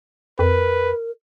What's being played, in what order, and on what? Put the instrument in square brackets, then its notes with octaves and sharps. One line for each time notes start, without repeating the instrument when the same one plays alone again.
[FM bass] F2 [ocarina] A#4 [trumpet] B4